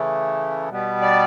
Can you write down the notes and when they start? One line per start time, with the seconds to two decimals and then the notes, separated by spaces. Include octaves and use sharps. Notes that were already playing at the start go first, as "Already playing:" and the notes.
Already playing: C#3 E3 A3
0.69 B2 G3 B3
1.01 D5